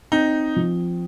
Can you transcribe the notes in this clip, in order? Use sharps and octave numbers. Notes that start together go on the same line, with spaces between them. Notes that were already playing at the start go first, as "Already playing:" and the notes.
C4 D#4
F3